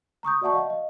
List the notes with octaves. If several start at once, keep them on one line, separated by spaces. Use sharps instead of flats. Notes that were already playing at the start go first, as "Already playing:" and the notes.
A#5 C#6 D#6 G6
F#4 D5 E5 F#5 A5 C#6
D#5 F5
D#5